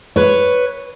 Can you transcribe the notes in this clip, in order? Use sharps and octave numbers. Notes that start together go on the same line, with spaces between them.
B4 C#5